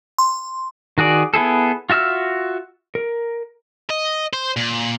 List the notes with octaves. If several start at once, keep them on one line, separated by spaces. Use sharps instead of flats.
C6
D#3 F#4 G#4 D5
B3 E4 G#4 A4
F4 F#4 E5 E6 F6
A#4
D#5
C5
A#2